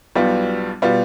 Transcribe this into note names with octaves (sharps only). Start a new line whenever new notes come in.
B1 B2 G3 B3 F4
B2 G3 B3 F4